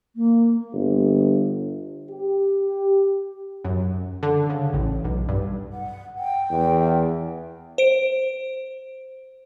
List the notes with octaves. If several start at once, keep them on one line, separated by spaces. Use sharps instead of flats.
A#3
G1
G4
F#2
D3
C#3
A1
B1
G2
F#5
G5
E2
C5 D7